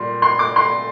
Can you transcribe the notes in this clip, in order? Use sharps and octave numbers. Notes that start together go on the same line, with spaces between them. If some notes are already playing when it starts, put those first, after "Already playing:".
Already playing: A#2 G3 C6
C6
D6
C6